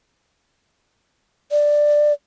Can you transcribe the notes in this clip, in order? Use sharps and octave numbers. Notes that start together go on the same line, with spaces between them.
D5